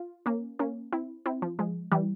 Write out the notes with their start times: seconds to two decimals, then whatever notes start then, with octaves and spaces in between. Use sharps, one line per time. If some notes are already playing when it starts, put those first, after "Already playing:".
Already playing: F4
0.26 A#3 C#4
0.59 A#3 C#4
0.92 C4 E4
1.26 C4 E4
1.42 F3
1.59 F3 G#3
1.92 E3 G3